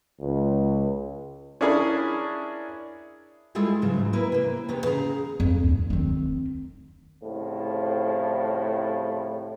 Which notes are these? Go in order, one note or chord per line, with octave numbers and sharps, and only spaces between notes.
C#2
C#4 D4 E4 G#4 A#4 B5
G3 G#3 E4 F4 G#4 A4
E2 G#2 C#3 F#3
A#3 E4 A#4 B4
C3 A#3
E2 C3 B3 C#5
C#3 G#4 A#5
F2
D#2
D#3 C4
C2 A2 C#3 F3